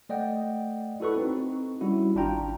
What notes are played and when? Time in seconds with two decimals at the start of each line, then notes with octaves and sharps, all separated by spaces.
0.09 A3 D5 D#5 F#5 G5
1.00 E4 F#4 A4 B4 C#6
1.16 C4 D#4
1.81 G3 C#4 E4 F#4
2.15 G#1 D4 F4 G5 A#5